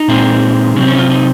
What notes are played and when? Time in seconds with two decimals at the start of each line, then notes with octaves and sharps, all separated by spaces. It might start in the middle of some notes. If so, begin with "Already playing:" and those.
Already playing: D#4
0.08 A#2 G#3 C4
0.76 C3 F#3 C4 C#4
0.87 C#4
0.94 D#4
0.99 F4
1.10 D#4